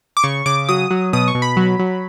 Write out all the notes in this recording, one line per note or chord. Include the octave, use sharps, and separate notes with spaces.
D6
C#3 C#6
C#3 D6
F#3 D#6
F#3
B2 D#6
C#6
B2
B5
F#3
F#3